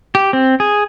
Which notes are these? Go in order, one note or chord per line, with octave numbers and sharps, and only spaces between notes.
G4
C4
G#4